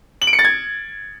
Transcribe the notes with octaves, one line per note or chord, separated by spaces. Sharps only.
F#7
D7
C#7
A6
G#6